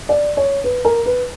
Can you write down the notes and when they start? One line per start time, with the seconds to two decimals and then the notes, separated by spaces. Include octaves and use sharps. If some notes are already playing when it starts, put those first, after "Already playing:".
0.09 D5
0.37 C#5
0.64 B4
0.85 A#4
1.06 B4